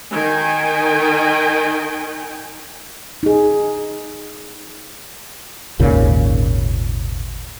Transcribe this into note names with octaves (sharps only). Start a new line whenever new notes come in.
D#3 G5 G#5
D#4 G#4
G#1 D#2 A#2 C#3